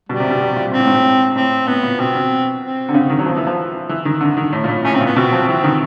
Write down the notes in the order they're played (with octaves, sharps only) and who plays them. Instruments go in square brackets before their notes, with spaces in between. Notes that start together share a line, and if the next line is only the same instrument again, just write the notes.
[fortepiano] B2 [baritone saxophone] G3
[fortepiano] C3
B2
B2
A#2
[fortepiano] A#2 [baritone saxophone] C4
[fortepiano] A2
G#2
A2
[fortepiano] A2 [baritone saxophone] C4
[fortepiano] A2 [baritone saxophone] B3
[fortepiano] A#2
[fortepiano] B2 [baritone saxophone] C4
[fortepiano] B2
[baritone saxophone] C4
[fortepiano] D3
C#3
D#3
F#3
[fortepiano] F3 [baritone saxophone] B3
[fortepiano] E3
F3
E3
D#3
D3
D#3
A2
A#2
A2
[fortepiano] A2 [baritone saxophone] C#4
[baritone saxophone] C4
[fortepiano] A#2 [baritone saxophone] B3
[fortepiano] B2 [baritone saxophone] C4
[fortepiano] F3
[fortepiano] E3 [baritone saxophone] C4
[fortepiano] D#3